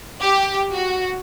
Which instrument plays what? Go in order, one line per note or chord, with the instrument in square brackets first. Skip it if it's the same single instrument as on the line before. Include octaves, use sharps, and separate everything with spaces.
[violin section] G4
F#4